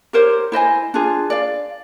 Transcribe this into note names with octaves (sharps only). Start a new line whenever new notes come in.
G4 A#4 C5 C#5
E4 C5 D#5 G#5
D4 F4 G#4
D5 F5